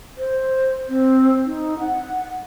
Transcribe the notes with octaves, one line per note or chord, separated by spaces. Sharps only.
C5
C4
D#4
F#5